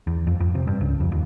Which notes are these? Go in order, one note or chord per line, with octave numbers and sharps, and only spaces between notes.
E2
F2
F2
C3
G2
C#2
F2
D#2